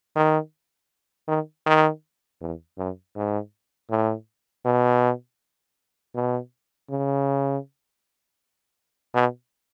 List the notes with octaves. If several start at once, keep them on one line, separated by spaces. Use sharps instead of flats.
D#3
D#3
D#3
E2
F#2
G#2
A2
B2
B2
C#3
B2